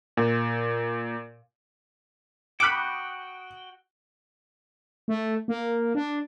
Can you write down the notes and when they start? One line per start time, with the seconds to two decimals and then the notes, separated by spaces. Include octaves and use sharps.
0.17 A#2
2.60 F#4 G5 B5 D6 D#6 F#6
5.08 A3
5.48 A#3
5.95 D4